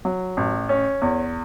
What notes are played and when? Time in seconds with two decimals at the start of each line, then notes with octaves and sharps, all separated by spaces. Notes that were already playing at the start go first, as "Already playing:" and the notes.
0.05 F#3
0.37 A1
0.69 C#4
1.02 E2